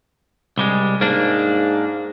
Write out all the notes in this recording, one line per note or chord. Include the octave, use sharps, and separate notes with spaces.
C2 G3 G#3
G#2 A#3 D4